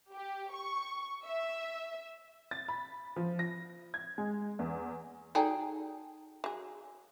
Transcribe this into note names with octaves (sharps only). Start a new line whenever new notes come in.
G4
C#6
E5
A6
B5
F3
A#6
G#6
G#3
E2
F#3 D#4 G#4 A4 D5 G5 A#5
F#3 G#4